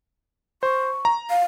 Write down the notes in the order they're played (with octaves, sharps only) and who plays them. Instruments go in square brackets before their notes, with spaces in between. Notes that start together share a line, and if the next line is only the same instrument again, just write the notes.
[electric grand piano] C5 [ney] C#6
[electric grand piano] A#5
[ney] F5